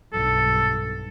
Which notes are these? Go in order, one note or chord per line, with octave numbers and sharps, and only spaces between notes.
B1 G2 A4